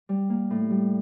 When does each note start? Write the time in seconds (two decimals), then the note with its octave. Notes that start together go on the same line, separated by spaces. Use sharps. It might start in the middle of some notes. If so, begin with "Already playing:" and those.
0.09 G3
0.30 A#3
0.50 A2
0.70 G3